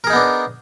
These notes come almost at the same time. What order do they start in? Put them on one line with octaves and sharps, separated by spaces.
A#4 G#4 D#4 B3 D4